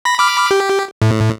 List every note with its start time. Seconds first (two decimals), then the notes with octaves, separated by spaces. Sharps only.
0.05 B5 A#6
0.18 B5 D6 F6
0.51 G4
1.02 A2